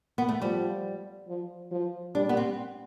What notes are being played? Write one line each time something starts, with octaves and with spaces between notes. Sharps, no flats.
B3
A3
F3 G3
F3
F3
G3 D4
B3
C4